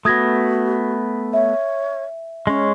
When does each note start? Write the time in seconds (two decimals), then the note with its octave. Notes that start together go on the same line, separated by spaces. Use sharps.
0.05 A3 B3 F#4 D#6 G#6 A#6
1.33 C#5 E5
2.47 G#3 C#4 C#5